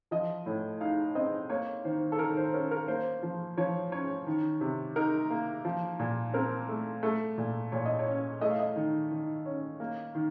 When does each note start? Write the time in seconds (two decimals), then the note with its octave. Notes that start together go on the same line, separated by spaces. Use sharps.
0.11 F3 D#5
0.46 A2
0.81 D#4 F5
1.15 C4 D#5
1.50 A#3 C#5
1.84 D#3 C5
2.12 A4
2.19 D#3 A#4
2.37 C5
2.54 C#4 A#4
2.71 A#4
2.88 A#3 C5
3.23 F3
3.57 F3 C#5
3.92 C#4 C#5
4.26 D#3
4.61 C3
4.96 D#4 A#4
5.30 A#3
5.65 F3
5.99 A#2
6.34 C4 A#4
6.68 A3
7.03 A3
7.38 A#2
7.72 A#2 C#5
7.85 D#5
7.99 C#5
8.07 C#4
8.41 A3 D#5
8.51 F5
8.59 D#5
8.76 D#3
9.11 D#3
9.46 C#4
9.80 A#3
10.15 D#3